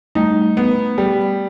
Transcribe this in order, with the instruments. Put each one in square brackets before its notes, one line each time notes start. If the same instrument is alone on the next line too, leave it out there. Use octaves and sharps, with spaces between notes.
[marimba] G3 A3 [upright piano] D#4
[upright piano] B3
G3